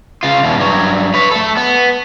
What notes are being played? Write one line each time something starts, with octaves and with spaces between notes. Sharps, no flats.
C#3 F4
E2 B2
G2 F#3
B4 C#5
A3 A4
B3